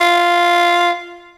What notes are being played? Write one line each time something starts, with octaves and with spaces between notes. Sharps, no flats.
F4